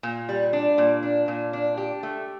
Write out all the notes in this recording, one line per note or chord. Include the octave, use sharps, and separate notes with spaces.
A#2
G3
D4
A#2
D4
A#2
D4
G4
A3